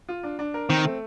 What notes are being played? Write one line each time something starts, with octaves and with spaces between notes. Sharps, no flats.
F4
D4
D4
A#4
D#3 C4
A3